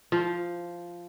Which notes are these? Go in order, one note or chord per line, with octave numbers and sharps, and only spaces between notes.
F3